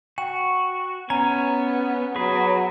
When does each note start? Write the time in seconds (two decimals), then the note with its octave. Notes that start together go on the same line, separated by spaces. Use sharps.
0.18 F#4 G5
1.10 B3 C#4 G#5 A#5
2.16 F#3 G#4 B4